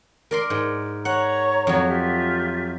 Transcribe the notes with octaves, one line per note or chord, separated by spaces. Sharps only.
A#4 D5 C6
G#2
C#5 F#5 A#5 C#6
F2 F#3
F4 G4 E5